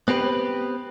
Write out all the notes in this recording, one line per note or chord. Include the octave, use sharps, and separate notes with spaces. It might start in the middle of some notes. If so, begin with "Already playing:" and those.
B3 C4 G4 B4